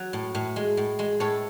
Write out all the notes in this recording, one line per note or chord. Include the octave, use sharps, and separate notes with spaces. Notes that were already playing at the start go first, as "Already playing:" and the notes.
Already playing: F#3
A2
A2
G#3
A2
G#3
A2 A4 C#5